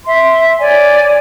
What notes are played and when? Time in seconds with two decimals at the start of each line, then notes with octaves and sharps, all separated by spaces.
0.07 E5 C6
0.59 C#5 D5 G#5